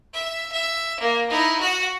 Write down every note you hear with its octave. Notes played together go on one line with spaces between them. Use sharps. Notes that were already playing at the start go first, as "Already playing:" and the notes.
E5
E5
A#3
D#4 E4
F#4 F#5